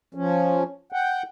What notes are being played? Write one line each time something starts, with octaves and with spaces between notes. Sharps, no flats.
F3 C#4
F#5 G5